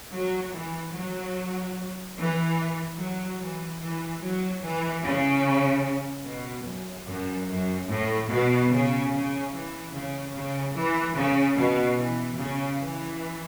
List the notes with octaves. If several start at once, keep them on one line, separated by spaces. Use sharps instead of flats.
F#3
E3
F#3
E3
F#3
E3
E3
F#3
E3
C#3
B2
F#2
F#2
F#2
A2
B2
C#3
C#3
E3
C#3
C#3
E3
C#3
B2
E3
C#3
E3